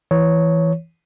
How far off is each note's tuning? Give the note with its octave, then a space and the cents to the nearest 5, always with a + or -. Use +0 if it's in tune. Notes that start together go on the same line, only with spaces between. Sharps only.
E3 +0 C#5 +0